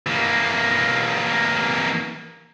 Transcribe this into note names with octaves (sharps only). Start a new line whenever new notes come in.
E3 A#3